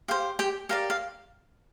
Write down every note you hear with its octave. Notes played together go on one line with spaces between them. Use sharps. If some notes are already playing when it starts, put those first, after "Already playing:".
G4 C5 F5
G4 G5
G4 A#4 D5 F5
F5